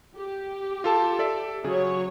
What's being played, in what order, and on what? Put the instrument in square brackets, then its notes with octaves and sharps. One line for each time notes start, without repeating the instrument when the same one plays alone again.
[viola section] G4
[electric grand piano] F4 A4 A5
A4 D5 E5
[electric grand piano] C#3 G#4 [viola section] F#3 C#5